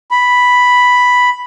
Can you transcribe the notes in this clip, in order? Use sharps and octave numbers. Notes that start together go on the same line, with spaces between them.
B5